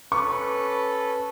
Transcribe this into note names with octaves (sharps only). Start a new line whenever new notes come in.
C#4 A4 B4 C#6